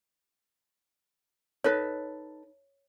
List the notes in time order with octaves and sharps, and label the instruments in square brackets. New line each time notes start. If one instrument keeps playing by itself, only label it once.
[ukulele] D#4 A4 B4 [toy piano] C#5